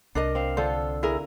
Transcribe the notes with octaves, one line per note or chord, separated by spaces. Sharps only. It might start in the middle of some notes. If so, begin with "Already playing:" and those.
C2 D4 A#4 D#5
C4 F5
D3 F4 A4 C5
E4 G#4 A#4